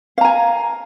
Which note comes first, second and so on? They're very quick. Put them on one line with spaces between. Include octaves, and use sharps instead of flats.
F5 A#5 G#5